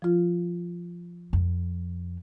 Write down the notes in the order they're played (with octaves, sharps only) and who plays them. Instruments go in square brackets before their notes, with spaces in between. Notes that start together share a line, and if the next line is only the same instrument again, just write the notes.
[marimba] F3 F4
[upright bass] F2